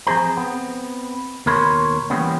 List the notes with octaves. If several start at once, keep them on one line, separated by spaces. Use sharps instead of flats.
F3 C4 G#4 C5 A#5
B3 C4
D#2 B2 A#4 C#5 B5 C6
E3 G3 A#3 B3 C#4